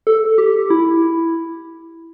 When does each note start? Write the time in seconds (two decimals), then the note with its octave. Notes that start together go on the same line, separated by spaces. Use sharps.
0.07 A4
0.38 G4
0.70 E4